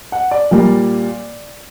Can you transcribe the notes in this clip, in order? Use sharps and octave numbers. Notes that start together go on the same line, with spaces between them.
F#5
D5
A#2 G3 A#3